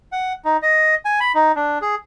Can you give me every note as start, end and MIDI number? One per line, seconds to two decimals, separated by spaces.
0.12 0.33 78
0.45 0.57 63
0.62 0.95 75
1.05 1.20 80
1.20 1.32 83
1.35 1.52 63
1.56 1.78 62
1.82 1.95 68